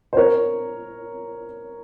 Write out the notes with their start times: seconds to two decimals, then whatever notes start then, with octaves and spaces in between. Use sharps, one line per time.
0.13 C5
0.17 A#4 C#5